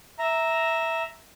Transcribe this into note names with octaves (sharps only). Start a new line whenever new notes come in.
E5 A#5